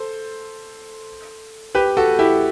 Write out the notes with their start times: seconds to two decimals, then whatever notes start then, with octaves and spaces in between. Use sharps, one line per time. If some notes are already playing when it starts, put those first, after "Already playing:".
Already playing: A4 C5
1.75 G4 B4
1.97 F#4 A4
2.19 E4 G4